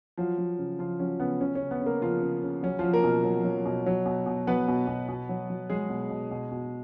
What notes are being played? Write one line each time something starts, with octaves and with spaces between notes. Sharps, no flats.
F3 F#3 F4
F#3
C#3
C#3 F3 F4
F#3 C#4
C#3 B3
C#3 C#4
C#4
C#3
B3
C#3
A#3 A#4
C#3 F3 F4
C#3
C#3
F#3 C#4
F3 F#3 F4
A#3 A#4
B2
F#3
F#3
B2
F#3
B2
B2
F#3 B3 B4
B2
B2
B2
F#3
F#3
F#3 G#3 G#4
B2
B2
B2
B2